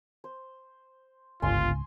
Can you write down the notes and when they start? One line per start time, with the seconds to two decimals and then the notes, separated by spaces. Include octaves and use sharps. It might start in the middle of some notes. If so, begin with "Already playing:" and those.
0.24 C5
1.42 G1 C#2 G#2 F4 G#5 C6 C#6